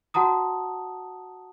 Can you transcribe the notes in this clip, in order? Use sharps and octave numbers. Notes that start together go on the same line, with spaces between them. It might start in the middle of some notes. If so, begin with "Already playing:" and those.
F#4 F#5 A5 A#5 D#6